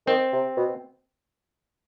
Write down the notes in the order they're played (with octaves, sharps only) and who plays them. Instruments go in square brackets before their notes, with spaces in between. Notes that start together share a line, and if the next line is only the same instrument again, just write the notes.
[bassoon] D#3 [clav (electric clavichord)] C4
[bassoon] C3
B2